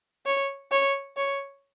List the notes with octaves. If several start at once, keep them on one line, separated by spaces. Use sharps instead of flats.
C#5
C#5
C#5